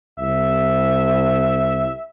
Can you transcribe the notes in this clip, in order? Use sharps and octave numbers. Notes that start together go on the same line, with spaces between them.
C2 E5